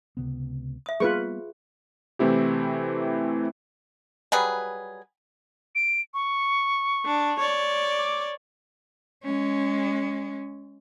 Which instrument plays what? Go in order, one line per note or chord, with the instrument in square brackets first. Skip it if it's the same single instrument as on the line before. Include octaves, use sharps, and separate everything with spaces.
[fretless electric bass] C#2 C3 B3
[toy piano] E5 D#6
[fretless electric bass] G3 A#3 B3 [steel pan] F4 B4 C#6 [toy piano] G#4
[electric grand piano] C3 E3 A3 C4 E4 G4
[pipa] F#3 G3 G#4 B4
[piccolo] D7
C#6
[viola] D4
C#5 D5
[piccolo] D6
[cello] G#3 C#4